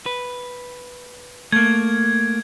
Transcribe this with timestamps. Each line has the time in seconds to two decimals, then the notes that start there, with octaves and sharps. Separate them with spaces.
0.06 B4
1.52 A3 A#3 G#6